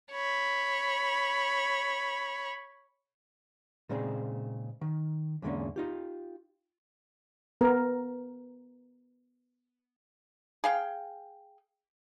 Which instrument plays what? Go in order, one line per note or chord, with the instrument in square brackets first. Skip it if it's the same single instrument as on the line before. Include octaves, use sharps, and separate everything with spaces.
[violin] C#5 B5
[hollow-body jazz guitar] A#2 C#3 G#3 C4 D#4 G#4
D#3
E2 G#2 D3 G#3 A#3 C#4
D#4 F4 G4
[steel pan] B3 A#4
[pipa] G#4 F5 G5